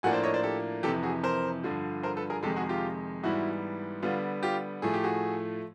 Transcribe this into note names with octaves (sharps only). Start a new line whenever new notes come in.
A2 F3 A#3 D4 F#5 G#5
C5 D5
C#5 D#5
C5 D5
G4 A4
F2 C3 E3 G4 A4
F#4 G#4
A#4 C5
G2 D3 F3
A#4 C5
A4 B4
G#4 A#4
F2 C3 D#3 G#3 G4 A4
F#4 G#4
F4 G4
G#2 E3 G3 B3 E4 F#4
D3 G3 B3 F4
F4 G4
A2 F3 A3 G#4
G4
F#4 G#4